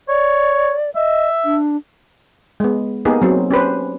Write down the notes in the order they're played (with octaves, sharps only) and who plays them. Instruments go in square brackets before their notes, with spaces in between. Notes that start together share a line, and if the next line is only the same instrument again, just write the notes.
[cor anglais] C#5 [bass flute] D5
[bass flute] D#5 [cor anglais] E5
[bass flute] D4
[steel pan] G#3 B3
A#3 B3 D#4 G4 G#4 A#4
F#3 C4
C#4 G4 B4 C5